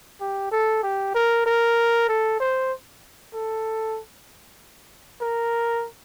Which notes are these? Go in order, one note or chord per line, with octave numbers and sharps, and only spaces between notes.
G4
A4
G4
A#4
A#4
A4
C5
A4
A#4